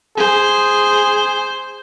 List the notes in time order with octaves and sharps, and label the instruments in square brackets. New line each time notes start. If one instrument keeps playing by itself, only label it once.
[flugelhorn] G#4 [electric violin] C5